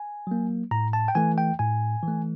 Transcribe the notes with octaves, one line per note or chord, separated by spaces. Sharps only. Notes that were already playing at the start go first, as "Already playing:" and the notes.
Already playing: G#5
F#3 A#3
A2 A#5
A5
G5
E3 A3 G#5
G5
A2 G#5
E3 A3